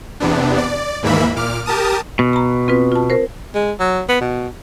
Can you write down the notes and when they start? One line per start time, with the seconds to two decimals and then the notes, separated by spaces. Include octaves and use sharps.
0.20 E2 C3 B3 D4
0.58 D5
1.03 D#2 G#2 E3 A#3 E5 B5
1.36 A#2 D6 F6
1.66 G4 A#4 A5 D#6
2.19 B2
2.33 A#5 B5
2.68 C4 F4 B4
2.92 F4 A5
3.10 A#4 C5
3.55 G#3
3.80 F#3
4.09 B3
4.21 B2